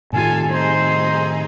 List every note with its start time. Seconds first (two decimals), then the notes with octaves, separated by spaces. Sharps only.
0.13 A2 C3 D#3 F4 G4 A4 G#5
0.50 C4 D#4 G#4 C5